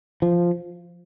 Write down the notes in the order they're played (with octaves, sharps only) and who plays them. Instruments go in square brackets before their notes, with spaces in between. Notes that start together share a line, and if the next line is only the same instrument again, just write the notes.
[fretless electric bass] F3